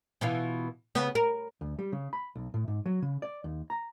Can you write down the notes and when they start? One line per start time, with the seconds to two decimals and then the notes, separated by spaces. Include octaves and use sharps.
0.21 B2 E3 F4
0.95 C#3 B3
1.15 A#4
1.61 D2
1.79 G3
1.92 C#3
2.13 B5
2.36 B1
2.54 A2
2.68 G#2
2.86 F#3
3.02 C#3
3.22 D5
3.44 D#2
3.70 A#5